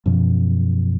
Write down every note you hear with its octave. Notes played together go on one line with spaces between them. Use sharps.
F#2 B2 F3